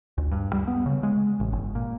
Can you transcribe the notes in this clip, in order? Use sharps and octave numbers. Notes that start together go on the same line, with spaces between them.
D2
G2
G3
B3
C#3
G#3
A1
G1
A#2